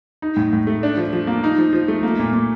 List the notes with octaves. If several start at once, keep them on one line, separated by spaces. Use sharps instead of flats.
D#4
A2
A2
A3
D4
F3
F3
A#3
D#4
F3
F3
A3
A#3
A#2
A#2